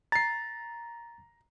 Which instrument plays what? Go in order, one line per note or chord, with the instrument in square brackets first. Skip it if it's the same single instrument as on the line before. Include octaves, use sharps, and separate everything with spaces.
[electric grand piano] A#5 C7 [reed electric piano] A6